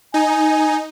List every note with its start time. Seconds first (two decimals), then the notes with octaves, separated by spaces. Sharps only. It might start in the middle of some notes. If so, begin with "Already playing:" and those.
0.14 D#4 G#5